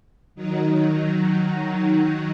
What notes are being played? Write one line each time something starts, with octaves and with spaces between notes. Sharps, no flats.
D#3 F#3 D#4